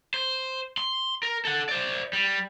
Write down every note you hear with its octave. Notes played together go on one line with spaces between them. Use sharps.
C5
C6
A#4
A4 F#5
C5 D5
G3